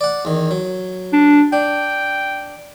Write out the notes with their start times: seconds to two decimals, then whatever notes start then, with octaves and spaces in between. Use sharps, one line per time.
0.01 D5 F#5
0.25 E2 D#3
0.51 F#3
1.13 D4
1.53 D4 G5